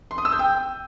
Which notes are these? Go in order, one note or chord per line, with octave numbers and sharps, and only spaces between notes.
C6
D#6
E6
G6
G5